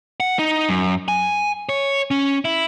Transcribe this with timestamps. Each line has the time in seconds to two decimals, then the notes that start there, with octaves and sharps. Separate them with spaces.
0.20 F#5
0.39 D#4
0.69 F#2
1.08 G#5
1.69 C#5
2.11 C#4
2.45 E4